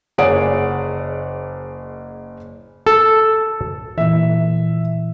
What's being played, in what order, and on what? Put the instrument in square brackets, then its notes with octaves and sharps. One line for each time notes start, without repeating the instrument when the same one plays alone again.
[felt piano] F#1 G#4 C#5 D5 F#5 D7
[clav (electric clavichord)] A4
[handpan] A#2 E3 [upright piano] E5